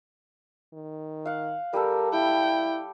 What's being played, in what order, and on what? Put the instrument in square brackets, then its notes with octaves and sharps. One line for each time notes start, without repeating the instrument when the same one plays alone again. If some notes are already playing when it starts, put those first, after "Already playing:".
[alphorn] D#3
[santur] F5 F#5
[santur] G3 G4 A4 [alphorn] A#4
[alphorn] E4 [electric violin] G5